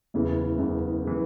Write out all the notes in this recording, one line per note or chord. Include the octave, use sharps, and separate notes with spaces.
F#1 E2 C#3 E3
F#1 E2 C#3 E3
C#3 E3